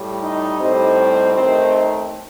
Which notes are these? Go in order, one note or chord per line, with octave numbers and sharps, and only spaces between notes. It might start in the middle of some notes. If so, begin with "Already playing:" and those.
Already playing: A2 G3
D#4 D#5
A2 G3 C4 D#4
D#2 D#3 A3 C4 D#4 C5